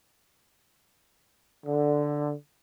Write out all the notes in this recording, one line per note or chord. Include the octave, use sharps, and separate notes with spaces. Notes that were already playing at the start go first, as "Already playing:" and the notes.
D3